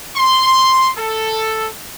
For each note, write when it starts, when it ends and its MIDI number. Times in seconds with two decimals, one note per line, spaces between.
0.16 0.89 84
0.97 1.68 69